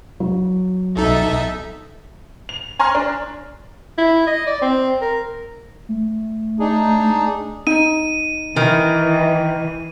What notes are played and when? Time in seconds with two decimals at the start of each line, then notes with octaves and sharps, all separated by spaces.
0.20 F#3
0.96 B1 D#4 A4 E5
2.49 F7
2.79 G#5 A#5 C6 C#6 F6
2.95 D4
3.98 E4
4.27 D#5
4.47 D5
4.62 C4
5.01 A#4
5.89 A3
6.60 D4 D#4 G#4
7.67 D#4 D#7
8.57 D#3 E3